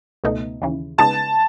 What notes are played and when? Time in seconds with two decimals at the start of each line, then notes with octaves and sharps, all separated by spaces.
0.24 C#2 B2 A3 D#4
0.62 D#2 C#3 E3
0.98 C#3 G#3 B3 D#4 A5